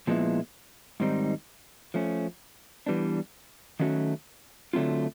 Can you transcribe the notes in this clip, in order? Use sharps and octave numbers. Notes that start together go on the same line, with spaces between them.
A#2 F3 G#3 B3 E4
G#2 D#3 G3 C4 D#4
F3 A3 C#4
E3 G3 B3 D4
D#3 F#3 A3 C#4 F#4
D3 F#3 A3 C4 F4